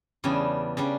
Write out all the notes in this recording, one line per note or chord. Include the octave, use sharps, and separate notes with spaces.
E2 C#3 G3 D4
C#3 G3 D4